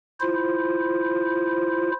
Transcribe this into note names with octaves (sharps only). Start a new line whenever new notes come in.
E4 F4 C5